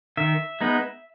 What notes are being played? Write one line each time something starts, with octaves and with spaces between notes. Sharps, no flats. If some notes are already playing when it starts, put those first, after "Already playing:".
D#3 E5
G#3 B3 D#4